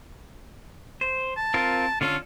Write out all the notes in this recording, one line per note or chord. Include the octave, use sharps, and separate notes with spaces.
C5
A5
C4 F4 A#4
D3 C#4 F4 A4